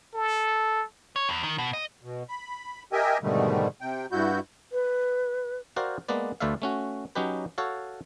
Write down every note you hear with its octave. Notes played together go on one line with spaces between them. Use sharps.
A4
C#5
E2
D#3
B2
D#5
B2
B5
G4 A#4 D#5 E5 G5 G#5
G#2 B2 D3 D#3 G3 A3
C3 G5
G2 E4 F#4 G6
B4
F#4 A#4 C5 D5 F5 G5
G#3 A#3 B3 B4 D5
D2 A3 B4 D5 E5 F5
A3 C#4 F#4
F#3 C#4 D#4 G4 B4
F#4 A4 C#5 F5